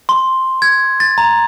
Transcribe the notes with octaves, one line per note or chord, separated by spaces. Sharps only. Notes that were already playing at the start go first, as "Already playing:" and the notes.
C6
G#6
A6
A#5